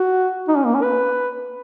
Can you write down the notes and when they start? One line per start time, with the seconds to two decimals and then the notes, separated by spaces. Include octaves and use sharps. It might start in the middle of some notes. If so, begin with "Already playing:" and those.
Already playing: F#4
0.48 D#4
0.57 C#4
0.65 A#3
0.74 C#4
0.82 B4